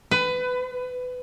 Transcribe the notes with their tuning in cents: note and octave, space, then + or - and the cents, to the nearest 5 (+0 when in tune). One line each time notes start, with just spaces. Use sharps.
B4 +20